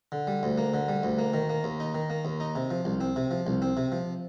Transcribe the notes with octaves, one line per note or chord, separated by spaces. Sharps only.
D3
G3
D2
A#3
D3
G3
D2
A#3
D#3
A#3
D#2
D#4
D#3
A#3
D#2
D#4
C3
F3
C2
C4
C3
F3
C2
C4
C3
F3